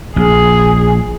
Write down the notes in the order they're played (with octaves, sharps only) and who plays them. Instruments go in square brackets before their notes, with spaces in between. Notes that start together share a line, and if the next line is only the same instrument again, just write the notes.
[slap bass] A#1 [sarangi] G#4